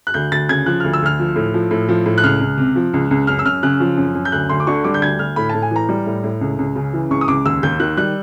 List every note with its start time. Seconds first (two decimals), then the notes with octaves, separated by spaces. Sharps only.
0.07 F#6
0.14 D2 G6
0.32 D2 A6
0.49 C#3 G#6
0.66 F3 F#6
0.80 D2 F6
0.93 E6
1.02 D2 F6
1.20 F3
1.36 A2
1.54 F3
1.71 A2
1.89 F3
2.06 A2
2.18 F#6
2.23 C#2 F6
2.41 C#2
2.58 C3
2.76 F3
2.93 C#2
3.11 C#2
3.27 F#2 F6
3.39 E6
3.45 F#2 F6
3.63 C#3 F#6
3.80 F3
3.97 F#2
4.15 F#2
4.25 G6
4.32 D2 F#6
4.49 D2 C6
4.60 D6
4.67 D3 C#6
4.84 G3 D6
4.94 G6
5.02 D2 G#6
5.19 D2 F6
5.36 A2 B5
5.49 A2 A5
5.62 G#5
5.71 E3 A#5
5.89 G3
6.06 A2
6.24 A2
6.41 C#2
6.59 C#2
6.76 C#3
6.93 E3
7.10 C#2 C#6
7.21 D#6
7.28 C#2 D6
7.45 D#2 E6
7.63 D#2 G6
7.80 D#3 F#6
7.97 G3 F#6